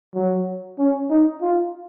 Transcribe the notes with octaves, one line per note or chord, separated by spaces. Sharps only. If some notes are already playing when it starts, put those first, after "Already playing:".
F#3
C#4
D#4
F4